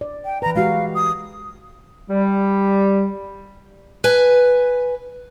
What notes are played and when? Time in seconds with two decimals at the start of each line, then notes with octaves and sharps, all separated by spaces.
0.01 D5
0.25 G5
0.42 E3 B4 A#5
0.56 G#3 F#4 G4 F5
0.95 D#6
2.10 G3
4.04 B4 G#5